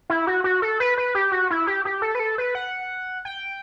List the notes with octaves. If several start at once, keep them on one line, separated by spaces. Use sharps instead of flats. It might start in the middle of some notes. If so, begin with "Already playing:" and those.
E4
F#4
F#4
A4
B4
B4
G4
F#4
E4
G4
G4
A4
B4
A4
B4
F#5
G5